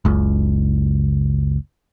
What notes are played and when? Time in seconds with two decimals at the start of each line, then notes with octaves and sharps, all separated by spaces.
0.05 F#1 C#2